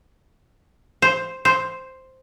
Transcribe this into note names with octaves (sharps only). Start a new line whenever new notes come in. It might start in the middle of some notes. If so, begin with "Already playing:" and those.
C5
C5